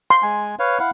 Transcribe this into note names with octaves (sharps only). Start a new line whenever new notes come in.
C6
G#3 G#5
B4 C#5 F5
E4 F5 F#5